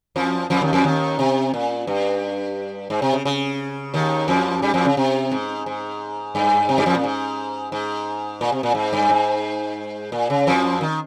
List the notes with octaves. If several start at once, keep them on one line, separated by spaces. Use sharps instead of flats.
F2 F3
F2 F3
D#2 D#3
F2 F3
D#2 D#3
C3
A#2
G2
G#2
C3
C#3
C#3
D#2 D#3
F2 F3
G2 G3
F2 F3
C#3
C3
G#2
G#2
G2
C3
G2 G3
F2 F3
A#2
G#2
G#2
A#2
C3
A#2
G#2
G2
G#2
A#2
C#3
F2 F3
D#3